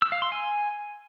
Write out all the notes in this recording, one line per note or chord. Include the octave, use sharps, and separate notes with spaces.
E6
F5
C6
G#5